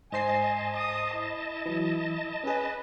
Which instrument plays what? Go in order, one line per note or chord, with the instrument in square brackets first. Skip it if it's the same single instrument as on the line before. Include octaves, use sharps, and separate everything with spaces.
[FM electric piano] G#2 C5 C7 [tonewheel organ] D#5 A5 [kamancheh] G#5
[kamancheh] D#6
E4
[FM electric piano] E3 F#3
[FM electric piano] C#4 G#4 [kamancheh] B4